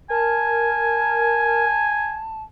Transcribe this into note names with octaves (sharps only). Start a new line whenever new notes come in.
A#4 G#5 A5